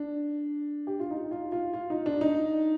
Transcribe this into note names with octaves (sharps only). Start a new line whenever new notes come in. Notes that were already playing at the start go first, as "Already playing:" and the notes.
Already playing: D4
G4
F4
D#4
F4
F4
F4
D#4
D4
D#4